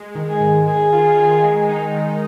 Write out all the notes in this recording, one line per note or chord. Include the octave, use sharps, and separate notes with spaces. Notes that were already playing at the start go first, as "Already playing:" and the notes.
Already playing: G#3
D#3
G#4
G#2
D#3 G#4
F4
D#3
G#3
D#4
D#3